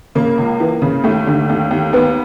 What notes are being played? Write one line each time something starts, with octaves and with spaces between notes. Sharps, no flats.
C#3 A#3
C#2
E3
C#3
D#2 A3
D3
D#2
D#2
D#2 B3